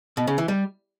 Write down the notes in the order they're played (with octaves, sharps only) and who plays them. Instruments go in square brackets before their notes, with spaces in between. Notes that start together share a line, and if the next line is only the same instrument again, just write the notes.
[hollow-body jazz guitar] B2
C#3
E3
G3